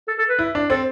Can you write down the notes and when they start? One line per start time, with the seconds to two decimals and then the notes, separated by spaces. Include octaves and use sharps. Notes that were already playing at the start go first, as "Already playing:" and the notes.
0.08 A4
0.19 A4
0.29 B4
0.39 E4
0.55 D4
0.70 C4 A4